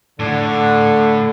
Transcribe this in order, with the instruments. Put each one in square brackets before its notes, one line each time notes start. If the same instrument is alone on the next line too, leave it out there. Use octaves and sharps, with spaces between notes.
[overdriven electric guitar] A2 [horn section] D3